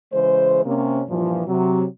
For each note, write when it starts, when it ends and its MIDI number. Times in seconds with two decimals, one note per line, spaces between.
0.13 0.63 49
0.13 0.63 52
0.13 0.63 56
0.13 0.63 72
0.65 1.01 48
0.65 1.01 58
0.65 1.01 61
1.09 1.42 43
1.09 1.42 46
1.09 1.42 52
1.09 1.42 53
1.47 1.85 48
1.47 1.85 54